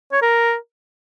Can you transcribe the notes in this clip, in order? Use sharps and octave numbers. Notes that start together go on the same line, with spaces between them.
C#5
A#4